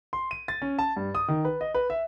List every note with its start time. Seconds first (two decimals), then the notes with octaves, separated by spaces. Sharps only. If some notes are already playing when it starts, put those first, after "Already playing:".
0.13 C6
0.31 D#7
0.48 A6
0.62 C#4
0.79 A5
0.97 G2
1.15 D#6
1.28 D#3
1.45 B4
1.61 D#5
1.74 B4
1.90 E5